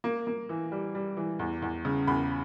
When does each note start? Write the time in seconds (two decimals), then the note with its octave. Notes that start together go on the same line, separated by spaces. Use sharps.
0.04 A#3
0.27 A#3
0.49 E3
0.72 G3
0.95 G3
1.17 E3
1.39 E2
1.62 E2
1.85 C#3
2.07 E2 B5